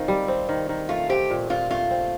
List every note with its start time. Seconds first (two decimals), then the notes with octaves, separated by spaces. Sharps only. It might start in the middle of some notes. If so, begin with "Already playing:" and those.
Already playing: D#3 C4 F4
0.08 G3
0.28 C4
0.49 D#3
0.69 D#3
0.89 A3 F4
1.09 C4 G4
1.30 A#2
1.50 A#2 F4
1.70 A3 F4
1.90 C4